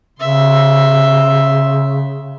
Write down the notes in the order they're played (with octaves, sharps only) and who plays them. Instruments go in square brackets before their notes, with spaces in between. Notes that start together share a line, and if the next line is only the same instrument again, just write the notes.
[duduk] C#3 [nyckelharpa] E5 C6